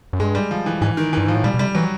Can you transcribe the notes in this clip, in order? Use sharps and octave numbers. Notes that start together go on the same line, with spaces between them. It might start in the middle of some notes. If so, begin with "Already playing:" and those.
F#2
G2 G#3
G3
F3
E3
G#2 E3
D#3
G2 E3
G#2 F3
A2
A#2 G3
B2
C3 G3
E3 F#3